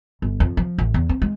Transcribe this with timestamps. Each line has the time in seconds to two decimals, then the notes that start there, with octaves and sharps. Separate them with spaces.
0.22 G1
0.40 F2
0.57 F3
0.78 A1
0.94 E2
1.09 C4
1.22 G#3